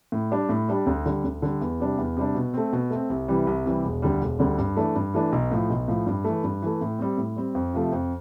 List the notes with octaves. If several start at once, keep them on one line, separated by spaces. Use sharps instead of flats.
A2
G3 D4 G4
A2
G3 D4 G4
D2
D3 G3
D2
D3 G3
E2
C3 G3 D4
E2
C3 G3 D4
B2
A3 C4
B2
A3 C4
C2
C3 E3 G3
C2
C3 E3 G3
E1
D2 D3 G3
E1
D2 D3 G3
G2
E3 A3 D4
G2
E3 A3 D4
B1
A2 F3
B1
A2 F3
G2
E3 A3
G2
E3 A3
A2
G3 C4
A2
G3 C4
F2
C3 F3 A3
F2